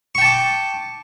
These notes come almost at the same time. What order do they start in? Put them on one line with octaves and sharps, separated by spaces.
C#6 G5 A5 D6